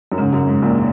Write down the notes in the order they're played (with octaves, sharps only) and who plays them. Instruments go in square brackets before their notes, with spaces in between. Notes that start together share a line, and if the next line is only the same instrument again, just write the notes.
[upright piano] F#2
[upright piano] G#2 [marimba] C#3 G#3 C#4
[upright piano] F#2
G#2
A#1 A#2